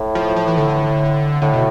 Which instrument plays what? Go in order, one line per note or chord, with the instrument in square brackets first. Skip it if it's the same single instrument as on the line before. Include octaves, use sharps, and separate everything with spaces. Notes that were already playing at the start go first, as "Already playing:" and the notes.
Already playing: [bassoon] A2
[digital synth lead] F3
F3
E3
D3
[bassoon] A2 [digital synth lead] D3
[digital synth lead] B2